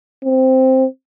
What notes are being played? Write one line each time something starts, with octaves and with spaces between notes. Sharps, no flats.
C4